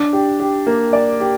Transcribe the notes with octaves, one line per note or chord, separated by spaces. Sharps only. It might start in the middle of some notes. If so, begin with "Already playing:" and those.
Already playing: D4
G4
G4
A#3
D5
G4